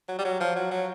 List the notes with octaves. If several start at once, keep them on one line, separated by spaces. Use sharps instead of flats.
F#3
G3
F#3
F3
F#3
F#3